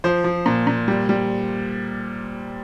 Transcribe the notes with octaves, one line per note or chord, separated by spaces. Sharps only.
F3 C5
F3
A#2
A#2
G3
G3